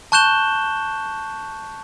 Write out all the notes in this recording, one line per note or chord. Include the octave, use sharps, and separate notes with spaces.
A5 C#6 F#6 G6 E7 G7